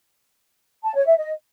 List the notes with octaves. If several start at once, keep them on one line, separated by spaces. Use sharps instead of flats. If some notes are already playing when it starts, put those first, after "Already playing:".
A5
C#5
E5
D#5